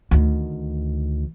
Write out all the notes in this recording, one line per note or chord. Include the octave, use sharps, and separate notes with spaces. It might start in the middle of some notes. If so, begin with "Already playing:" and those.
D2 D#3